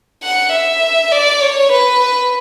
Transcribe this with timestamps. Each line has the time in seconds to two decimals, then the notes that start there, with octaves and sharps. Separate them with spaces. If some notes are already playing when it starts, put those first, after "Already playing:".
0.23 F#5
0.52 E5
1.12 D5
1.42 C#5
1.72 B4